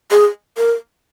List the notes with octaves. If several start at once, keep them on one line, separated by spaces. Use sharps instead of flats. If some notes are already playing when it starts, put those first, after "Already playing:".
G#4
A#4